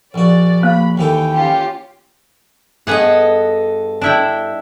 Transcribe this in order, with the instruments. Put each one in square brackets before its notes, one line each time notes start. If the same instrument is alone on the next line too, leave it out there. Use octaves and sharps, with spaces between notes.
[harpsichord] A#1 F#4 [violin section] D5
[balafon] A#3 [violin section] B5
[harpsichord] D#2 E3 A4 [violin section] G5
[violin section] C#4 F4 G4
[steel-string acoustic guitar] G2 A4 D#5 [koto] B3 G#4 F#5
[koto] D4 E4 G5